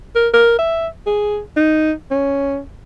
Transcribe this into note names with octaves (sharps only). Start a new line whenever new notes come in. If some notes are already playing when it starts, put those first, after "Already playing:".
A#4
A#4
E5
G#4
D#4
C#4